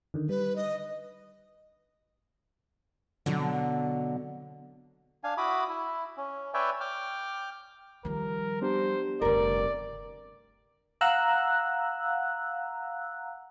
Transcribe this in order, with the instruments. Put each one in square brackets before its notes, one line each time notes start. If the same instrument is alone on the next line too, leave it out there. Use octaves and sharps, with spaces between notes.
[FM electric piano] D3 D#3
[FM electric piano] G3 [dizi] B4
[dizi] D#5
[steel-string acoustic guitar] B2 F#3 [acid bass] D3
[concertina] D4 F5 G#5
E4 F#4 B5 D6 D#6
E4
C#4
B4 C#5 D5 E5 G5 G#5
G5 D6 F6
[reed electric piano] D#3 [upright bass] F3 G3 [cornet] A#4
[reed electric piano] B3 D4 G4 [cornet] C5
[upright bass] F1 D3 [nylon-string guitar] G2 A#4 [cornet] D5
[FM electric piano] F5 F#5 A#5 E6 F#6